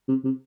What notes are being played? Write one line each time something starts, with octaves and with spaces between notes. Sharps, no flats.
C3
C3